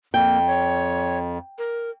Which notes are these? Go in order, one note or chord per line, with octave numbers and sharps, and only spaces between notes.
F2 A#3 G5
C#5
A#4